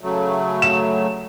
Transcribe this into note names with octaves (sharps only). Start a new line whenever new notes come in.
C#3 F#3 A3
E7